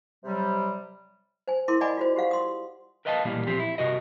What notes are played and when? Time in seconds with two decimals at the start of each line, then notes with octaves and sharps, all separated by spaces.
0.24 C3 F#3 G3
1.48 C5 G#5
1.68 E4 A#4 C6 D6
1.81 D5 D#5 F#5 G#5 B5 D6
1.97 F4 F#4 C5
2.16 G4 C5 F5 F#5
2.31 C6 D#6
3.05 A#4 B4 D#5 F5 G5 A5
3.25 B1 A#2 E3 G3 A#3 A#4
3.46 A#2 F3 C4 G4
3.59 E4
3.78 G2 C3 F#4 A#4 D#5